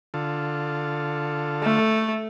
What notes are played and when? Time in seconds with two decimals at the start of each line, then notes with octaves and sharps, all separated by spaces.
0.14 D3 F4 A4
1.62 A3